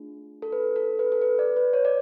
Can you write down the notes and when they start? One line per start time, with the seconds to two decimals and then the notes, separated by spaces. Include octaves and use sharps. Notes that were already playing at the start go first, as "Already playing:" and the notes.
Already playing: A3 D4 F4 G#4
0.42 A4
0.52 B4
0.76 A4
0.99 B4
1.12 A4
1.22 B4
1.39 D5
1.56 B4
1.73 C#5
1.85 D5